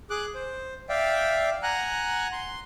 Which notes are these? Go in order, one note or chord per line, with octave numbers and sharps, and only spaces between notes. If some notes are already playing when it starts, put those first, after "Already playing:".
G#4 D6 F#6
C5
D5 E5 F5 G5
F#5 G#5 A#5 F#6
C6